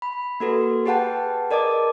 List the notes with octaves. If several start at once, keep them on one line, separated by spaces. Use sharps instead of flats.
B5
A#3 F#4 A4 B4
G4 G#4 B4 F#5 G5 A5
A#4 D5 D#5 A5 D6